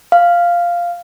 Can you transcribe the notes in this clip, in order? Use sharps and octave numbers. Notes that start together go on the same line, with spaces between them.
F5